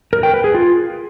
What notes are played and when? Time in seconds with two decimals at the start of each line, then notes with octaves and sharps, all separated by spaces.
0.13 A#4
0.23 G5
0.34 B4
0.44 G#4
0.55 F4